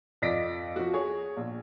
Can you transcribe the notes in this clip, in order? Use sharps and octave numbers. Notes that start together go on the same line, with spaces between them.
F2 D5 D#5 A#6 B6 D7
F3 F#4
G#4 C#5
A#1